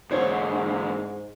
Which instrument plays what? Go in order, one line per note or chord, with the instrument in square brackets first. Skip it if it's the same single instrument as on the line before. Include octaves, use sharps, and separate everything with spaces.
[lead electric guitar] E2 D3 [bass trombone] G#2 [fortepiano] C5 C#5